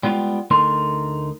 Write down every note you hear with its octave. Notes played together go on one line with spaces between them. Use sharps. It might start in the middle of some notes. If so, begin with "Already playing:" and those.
G3 G#3 B3 F4 G4
D2 A3 D#4 A#4 C6